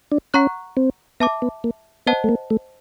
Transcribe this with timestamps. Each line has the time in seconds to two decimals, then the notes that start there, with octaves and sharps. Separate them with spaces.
0.12 D4
0.34 C#4 F#5 A#5 C#6 F#6
0.77 C4
1.20 B3 E5 A5 D6
1.42 B3
1.64 A#3
2.06 B3 C5 D#5 F#5 A5
2.24 A3
2.29 A#3
2.50 A3